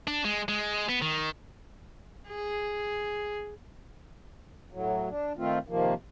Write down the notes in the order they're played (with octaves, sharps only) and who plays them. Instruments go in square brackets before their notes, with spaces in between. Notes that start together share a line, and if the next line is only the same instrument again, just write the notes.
[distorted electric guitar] D4
G#3
G#3
B3
D#3
[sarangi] G#4
[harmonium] A2 F#3
D4
D#3 A3 C4 F4
C3 D#3 F3 A#3